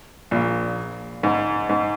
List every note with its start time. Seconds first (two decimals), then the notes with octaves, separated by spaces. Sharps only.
0.31 A#1 A#2
1.23 G#2
1.69 G#2